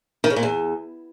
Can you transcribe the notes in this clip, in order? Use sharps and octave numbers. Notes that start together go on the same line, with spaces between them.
D#3
C#3
A#2
E2